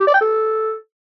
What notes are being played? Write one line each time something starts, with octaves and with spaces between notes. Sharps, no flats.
G4
D5
G5
A4